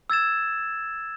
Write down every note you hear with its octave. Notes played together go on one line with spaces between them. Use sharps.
E6 G#6 A6 E7